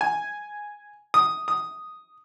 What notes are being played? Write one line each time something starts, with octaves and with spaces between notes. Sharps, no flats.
G#5
D#6
D#6